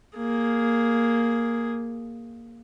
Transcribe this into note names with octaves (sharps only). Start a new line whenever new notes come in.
A#3 G#4